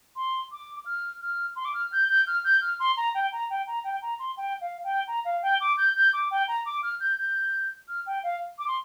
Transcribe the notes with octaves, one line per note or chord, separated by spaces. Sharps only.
C6
D6
F6
F6
C6
D6
F6
G6
G6
F6
G6
F6
C6
A#5
G5
A#5
G5
A#5
G5
A#5
C6
G5
F5
G5
A#5
F5
G5
D6
G6
G6
D6
G5
A#5
D6
F6
G6
G6
F6
G5
F5
D6
C6